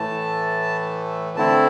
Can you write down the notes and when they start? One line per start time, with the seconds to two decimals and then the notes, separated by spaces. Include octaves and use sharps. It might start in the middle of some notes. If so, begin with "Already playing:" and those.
Already playing: A2 E3 A3 A5
1.37 D3 A3 C4 E4 A5